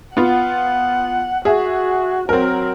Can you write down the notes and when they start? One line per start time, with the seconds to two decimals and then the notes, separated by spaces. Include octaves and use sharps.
0.17 B3 F4 F#5
1.45 F#4 G#4 E5
2.29 F#3 C4 A#4